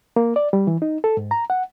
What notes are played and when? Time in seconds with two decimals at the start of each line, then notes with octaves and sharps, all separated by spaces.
0.16 A#3
0.36 D5
0.53 G3
0.67 E3
0.82 D#4
1.04 A4
1.17 G#2
1.31 A#5
1.50 F#5